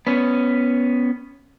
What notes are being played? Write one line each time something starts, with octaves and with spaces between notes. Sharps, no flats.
B3 C#4